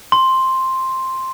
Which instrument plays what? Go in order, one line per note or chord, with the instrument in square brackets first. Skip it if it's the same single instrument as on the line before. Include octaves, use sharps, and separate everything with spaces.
[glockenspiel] C6